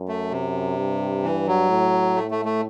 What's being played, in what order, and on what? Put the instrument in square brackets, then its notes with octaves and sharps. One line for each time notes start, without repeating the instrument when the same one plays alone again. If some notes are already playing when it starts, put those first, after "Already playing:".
Already playing: [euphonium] F#2
[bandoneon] A3
C3
[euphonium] G2
[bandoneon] E3
F#3
[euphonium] A2
[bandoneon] A3
A3
A3